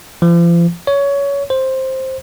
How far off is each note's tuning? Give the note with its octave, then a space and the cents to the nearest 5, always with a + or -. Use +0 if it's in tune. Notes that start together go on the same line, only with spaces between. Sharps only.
F3 -40
C#5 +20
C5 +10